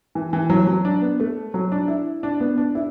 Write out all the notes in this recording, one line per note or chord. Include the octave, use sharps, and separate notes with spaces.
E3
E3
F#3
F#3
D4
B3
A3
F#3
D4
E4
D4
B3
D4
E4